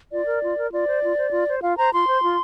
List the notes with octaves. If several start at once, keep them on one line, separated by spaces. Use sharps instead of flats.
F4 D5
A#4
F4
A#4
F4 D5
C5
F4
C5
F4
C5
F4 F5
C5 A#5
F4 C6
C5
F4